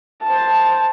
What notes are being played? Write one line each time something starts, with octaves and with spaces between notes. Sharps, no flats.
C5 A5